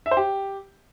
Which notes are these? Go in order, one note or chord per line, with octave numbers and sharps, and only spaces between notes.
E5
C5
G4